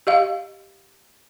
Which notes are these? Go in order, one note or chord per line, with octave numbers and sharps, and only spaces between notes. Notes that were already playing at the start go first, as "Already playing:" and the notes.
G4 D#5 F5